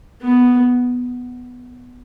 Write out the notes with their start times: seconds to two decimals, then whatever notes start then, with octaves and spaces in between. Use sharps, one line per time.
0.22 B3